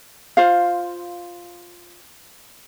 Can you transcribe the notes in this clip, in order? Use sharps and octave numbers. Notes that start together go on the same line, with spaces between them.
F4 C5 F5